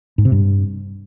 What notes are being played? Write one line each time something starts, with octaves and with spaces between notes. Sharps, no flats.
G#2
C3
G2